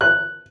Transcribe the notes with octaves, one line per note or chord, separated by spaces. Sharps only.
F#6